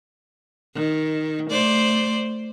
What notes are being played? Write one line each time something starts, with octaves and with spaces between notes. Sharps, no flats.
D#3
A3 C5 D5